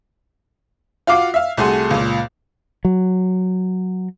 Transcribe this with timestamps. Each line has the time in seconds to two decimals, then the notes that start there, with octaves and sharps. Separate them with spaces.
1.07 F4 F#4 F5 D6 C7
1.34 E5 F5
1.57 C2 A3 F#4 G#4 C6
1.91 C#2 A#2
2.85 F#3